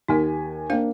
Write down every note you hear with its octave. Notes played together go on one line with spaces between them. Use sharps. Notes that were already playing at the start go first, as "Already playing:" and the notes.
D#2 A#3 D#4 G#5 B6
A#3 D4 C5 F5 G5